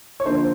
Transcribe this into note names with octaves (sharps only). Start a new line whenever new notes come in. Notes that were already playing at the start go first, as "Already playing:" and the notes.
C#5
D3 F3 A#3 D4 C5
C5